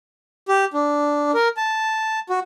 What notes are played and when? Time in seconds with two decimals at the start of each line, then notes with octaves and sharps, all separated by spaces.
0.49 G4
0.74 D4
1.34 A#4
1.57 A5
2.30 F#4